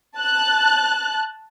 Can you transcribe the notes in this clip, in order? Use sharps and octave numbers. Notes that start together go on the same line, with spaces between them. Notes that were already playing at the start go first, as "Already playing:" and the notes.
A5 F#6